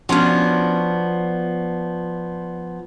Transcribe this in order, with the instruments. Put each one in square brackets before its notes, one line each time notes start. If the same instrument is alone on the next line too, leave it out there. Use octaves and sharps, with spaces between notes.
[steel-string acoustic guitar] F3 B3 [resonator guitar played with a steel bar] C#4 D4 F#4